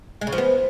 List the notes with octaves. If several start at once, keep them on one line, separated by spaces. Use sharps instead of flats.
G#3
C#3
F3
B3